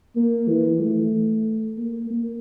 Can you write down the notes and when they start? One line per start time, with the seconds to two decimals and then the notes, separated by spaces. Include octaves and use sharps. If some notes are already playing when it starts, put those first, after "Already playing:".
0.16 A#3
0.48 E3
0.80 A3
1.77 A#3
2.10 A#3